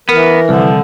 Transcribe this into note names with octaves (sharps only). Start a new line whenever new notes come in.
E3 B3 A#4
C2 D3 F3